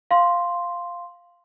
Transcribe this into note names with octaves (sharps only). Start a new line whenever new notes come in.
F5 C6